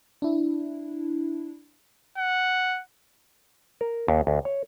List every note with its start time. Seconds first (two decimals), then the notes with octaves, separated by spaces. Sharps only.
0.22 D4 E4
2.18 F#5
3.81 A#4
4.08 D#2
4.27 D2
4.45 C#5